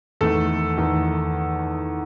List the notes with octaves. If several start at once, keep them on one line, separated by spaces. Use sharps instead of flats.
E2 D#3 A3 A4
E2 D#3 A3